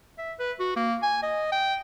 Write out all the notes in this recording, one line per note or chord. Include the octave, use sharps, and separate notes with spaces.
E5
B4
F#4
A#3
G#5
D#5
G5